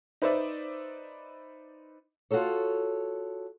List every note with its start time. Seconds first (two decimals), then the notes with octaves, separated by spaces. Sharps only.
0.22 D#4 B4 C5 D5 E5
2.31 F4 F#4 G#4 A4 C#5